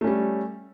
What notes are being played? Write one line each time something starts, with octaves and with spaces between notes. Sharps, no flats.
G3 A3 C#4